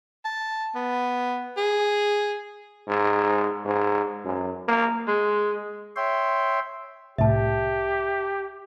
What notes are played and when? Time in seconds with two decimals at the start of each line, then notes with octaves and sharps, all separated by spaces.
0.25 A5
0.75 B3
1.57 G#4
2.88 G#2
3.65 G#2
4.24 F#2
4.68 A#3
5.08 G#3
5.96 C#5 E5 G5 C6
7.18 C2 A2 G4 E5 A5